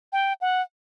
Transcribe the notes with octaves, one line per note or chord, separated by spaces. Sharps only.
G5
F#5